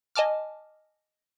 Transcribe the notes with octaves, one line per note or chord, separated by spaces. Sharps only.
D#5 G#5 A5 D6 F6